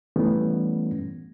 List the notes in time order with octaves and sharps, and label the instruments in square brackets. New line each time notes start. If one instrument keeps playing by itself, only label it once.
[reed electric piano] E3 G3 A3 B3 C#4